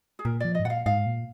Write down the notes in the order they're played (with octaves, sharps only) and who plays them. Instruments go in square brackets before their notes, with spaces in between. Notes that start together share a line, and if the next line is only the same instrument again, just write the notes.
[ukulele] G#4
[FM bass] A#2 [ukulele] A#4
[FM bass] F3 [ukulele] D5
[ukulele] D#5
[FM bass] G#2
[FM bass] A#2 [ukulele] F5 F#5
[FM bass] G#2 [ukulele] F5
[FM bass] A#2